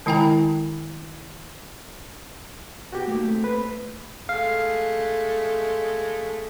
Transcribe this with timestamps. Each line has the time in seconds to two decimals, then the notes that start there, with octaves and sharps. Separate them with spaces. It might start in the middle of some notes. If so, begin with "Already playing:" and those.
0.06 D#3 G#3 E4 G5 G#5 A#5
2.93 B2 F#4 G4 G5
3.06 A3 A#3 D#4
3.23 A3 C4
3.44 C4 B4 C5
4.29 G#3 A3 F5